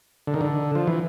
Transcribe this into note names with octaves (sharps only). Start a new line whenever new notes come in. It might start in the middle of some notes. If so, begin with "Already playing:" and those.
D3
D#3
D3
F3
E3